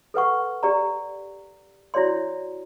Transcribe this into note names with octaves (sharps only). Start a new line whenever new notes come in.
A4 B4 F#5 C#6
G4 D5 A#5
E4 F#4 C#5 D5 C6